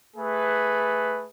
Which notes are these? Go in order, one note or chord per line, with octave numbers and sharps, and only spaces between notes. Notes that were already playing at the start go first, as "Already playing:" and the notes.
A3 G#4 B4